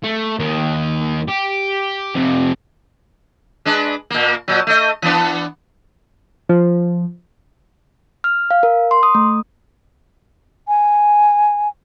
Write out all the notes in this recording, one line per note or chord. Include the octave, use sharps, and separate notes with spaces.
A3
D#2 D#3
G4
F2 C3
G#3 D4 B4
A#2 A#3
A#2 F#3
A3 D#5
E3 B3 D4
F3
F6
F5
A#4
C6
D#6
A3
G#5